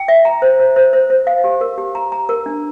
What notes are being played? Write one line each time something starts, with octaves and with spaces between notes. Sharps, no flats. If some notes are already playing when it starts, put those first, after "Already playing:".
Already playing: G5
E5
A#5
C5
C5
C5
C5
C5
F5
G4
A#4
G4
A#5
A#5
A#4
D4